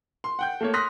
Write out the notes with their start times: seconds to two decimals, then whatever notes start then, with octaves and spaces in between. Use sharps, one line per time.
0.24 C6
0.39 F#5 G5 G6
0.61 A3 A#3 C#5
0.74 C6 D#6 F6 F#6 A#6 B6